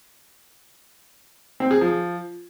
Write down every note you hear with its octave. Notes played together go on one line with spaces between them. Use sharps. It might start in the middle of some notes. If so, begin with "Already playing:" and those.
C4
G#4
F3